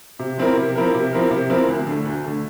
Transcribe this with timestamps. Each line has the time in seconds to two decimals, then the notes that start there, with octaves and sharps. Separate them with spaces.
0.19 C3
0.38 F3 C4 E4 A#4
0.57 C3
0.75 F3 C4 E4 A#4
0.94 C3
1.13 F3 C4 E4 A#4
1.30 C3
1.50 F3 C4 E4 A#4
1.68 D2
1.87 D3 A3
2.05 D2
2.24 D3 A3